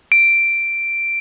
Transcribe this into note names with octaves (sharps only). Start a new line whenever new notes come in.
D7